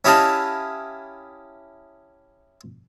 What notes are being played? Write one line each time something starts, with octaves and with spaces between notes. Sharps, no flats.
C#4 E4 G4 D#5 F5 A5